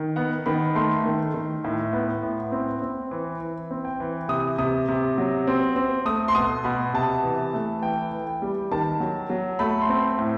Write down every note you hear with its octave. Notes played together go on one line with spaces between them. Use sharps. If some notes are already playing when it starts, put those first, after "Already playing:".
Already playing: D#3
B3 F#5
D#3 B5
A3 C6
D#3
D#3
A2
B3
A2
C4
C4
E3
E3
C4
G5
E3
C3 D#6
C3 D#6
C3
F#3
C4
C4
A3 D#6
C6
B2 D#6
B2 B5
C3 A5
E3
A3
E3 G5
E3
G5
G3
D#3 A5
F#3
F#3
A3 B5
C6
C4
A2